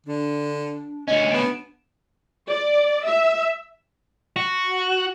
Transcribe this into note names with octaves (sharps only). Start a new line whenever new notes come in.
D3 D4
D2 C#4 D4 D#5
B3 D7 E7
D5
E5
F#4